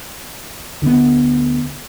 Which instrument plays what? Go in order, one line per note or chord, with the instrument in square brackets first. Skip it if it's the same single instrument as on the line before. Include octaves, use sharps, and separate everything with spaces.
[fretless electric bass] D2 D3 D#3 B3